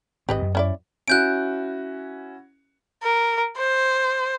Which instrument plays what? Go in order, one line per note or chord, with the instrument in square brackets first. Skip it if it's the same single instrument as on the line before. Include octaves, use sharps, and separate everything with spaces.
[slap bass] G#1 G#2 C4 [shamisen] G4 B4 D#5
[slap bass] F#2
[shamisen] C#4 E4 D5
[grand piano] C#4 E4 F#4 [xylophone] F#6 G6 D7
[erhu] A#4
C5